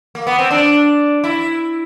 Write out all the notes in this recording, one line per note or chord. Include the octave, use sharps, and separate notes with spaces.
A#3
B3
C4
D4
E4